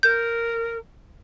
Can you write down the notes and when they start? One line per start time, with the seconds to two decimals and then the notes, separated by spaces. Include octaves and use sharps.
0.03 A#4 G6